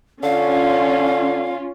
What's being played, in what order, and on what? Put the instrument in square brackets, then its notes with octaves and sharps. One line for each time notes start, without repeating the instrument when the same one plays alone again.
[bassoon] D3 [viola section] C#4 F4 [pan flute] F5